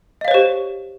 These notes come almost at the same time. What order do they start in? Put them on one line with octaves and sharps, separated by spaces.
D#5 F5 C#5 C5 G4